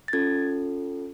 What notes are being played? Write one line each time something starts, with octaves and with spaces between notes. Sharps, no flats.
A6
C#4 F4 A4 G#6